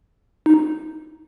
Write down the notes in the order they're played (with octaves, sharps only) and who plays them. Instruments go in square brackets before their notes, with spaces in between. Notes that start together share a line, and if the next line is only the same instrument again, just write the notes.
[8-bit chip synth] D#4